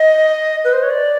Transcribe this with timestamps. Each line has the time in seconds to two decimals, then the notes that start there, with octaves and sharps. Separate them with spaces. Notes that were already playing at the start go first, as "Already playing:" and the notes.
Already playing: D#5
0.64 B4
0.73 C5
0.83 C#5
0.90 D5